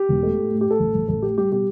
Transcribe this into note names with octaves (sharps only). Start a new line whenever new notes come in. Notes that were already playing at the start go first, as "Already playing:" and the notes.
Already playing: G4
E1
A3
A2
A2
G4
A2 A4
A1
A1
A1 A4
A2 G4
G3 G4
B2 G4